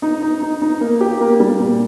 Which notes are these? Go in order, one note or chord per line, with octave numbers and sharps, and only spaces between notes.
D#4
D#4
D#4
D#4
A#3
G4
A#3
G3
A#2